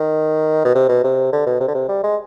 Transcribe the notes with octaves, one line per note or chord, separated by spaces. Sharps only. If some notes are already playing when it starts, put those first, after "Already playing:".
Already playing: D#3
B2
C3
B2
C3
D3
B2
C3
D3
C3
G3
G#3